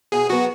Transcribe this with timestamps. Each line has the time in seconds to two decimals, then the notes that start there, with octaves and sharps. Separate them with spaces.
0.12 B2 G#4
0.29 F#3 B3 F#4